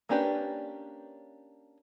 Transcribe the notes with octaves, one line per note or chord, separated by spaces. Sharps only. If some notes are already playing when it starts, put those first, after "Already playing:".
A#3 C#4 D4 G4 B4